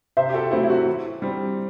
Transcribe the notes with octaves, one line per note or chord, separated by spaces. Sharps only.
C3 C5 E5
G4
F#4 A4
F#3 A3 C4 E4 G4
E4
F#4
E3
G3 C4